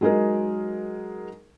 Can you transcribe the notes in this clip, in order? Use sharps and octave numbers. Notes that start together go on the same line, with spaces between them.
F#3 G#3 D#4 G#4 A#4